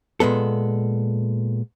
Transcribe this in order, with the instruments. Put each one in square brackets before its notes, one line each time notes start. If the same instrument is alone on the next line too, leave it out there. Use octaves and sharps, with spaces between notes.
[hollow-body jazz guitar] A#2 G#3 B3 A4